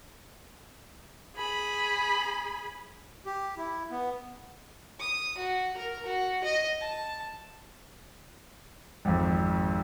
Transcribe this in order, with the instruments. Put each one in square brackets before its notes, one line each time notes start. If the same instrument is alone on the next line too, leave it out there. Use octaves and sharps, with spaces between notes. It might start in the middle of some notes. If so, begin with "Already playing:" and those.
[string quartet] G#4 B5
[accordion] G4
E4
B3
[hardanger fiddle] D#6
F#4
A#4
F#4
D#5
A5
[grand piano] G#1 F2